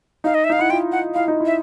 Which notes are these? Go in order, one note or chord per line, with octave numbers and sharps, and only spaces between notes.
D#4 F5
D#5
E5
D#4 F5
E4 F#5
F4 G5
F#5
E4 F5
D#4
E4
E5